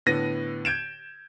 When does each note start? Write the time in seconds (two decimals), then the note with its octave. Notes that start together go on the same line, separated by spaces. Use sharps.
0.06 A2 D3 B3 A#6 D#7
0.65 G6 G#6 D7 E7